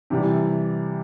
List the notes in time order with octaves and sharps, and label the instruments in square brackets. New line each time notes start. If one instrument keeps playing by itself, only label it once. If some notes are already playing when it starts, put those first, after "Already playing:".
[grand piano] C3 E3 G3